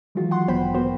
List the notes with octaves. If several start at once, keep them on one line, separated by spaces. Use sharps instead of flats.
D#3 E3 F#3 G#3 F4 F#4
F#5 C6
A1 G2 B3 C5 G5 B5
A#3 B3 F#4 C5